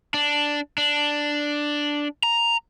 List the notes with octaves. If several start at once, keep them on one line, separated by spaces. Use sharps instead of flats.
D4
D4
A#5